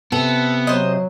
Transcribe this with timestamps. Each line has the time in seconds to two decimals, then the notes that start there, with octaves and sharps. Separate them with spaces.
0.12 C3 B3 A4
0.67 F#3 C5 D#5